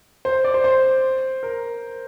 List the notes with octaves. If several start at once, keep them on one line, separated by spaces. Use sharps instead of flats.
C5
D5
C5
C5
A#4